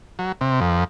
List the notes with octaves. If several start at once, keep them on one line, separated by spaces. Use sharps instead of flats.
F#3
C3
F2